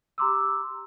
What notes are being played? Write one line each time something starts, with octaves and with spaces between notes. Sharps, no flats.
G4 A#5 C6 D6 E6